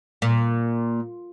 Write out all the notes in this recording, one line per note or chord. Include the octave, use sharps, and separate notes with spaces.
A#2